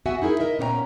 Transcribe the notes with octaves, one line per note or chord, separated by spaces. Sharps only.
B3 F#4 E5 F#5 G#5
D#4 E4 G#4 A#4
A#4 D#5 E5
A#2 B3 C#4 C#5 G5 A#5